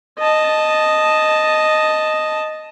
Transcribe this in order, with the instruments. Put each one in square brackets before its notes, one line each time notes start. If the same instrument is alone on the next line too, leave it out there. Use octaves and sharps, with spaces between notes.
[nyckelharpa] D#5 A5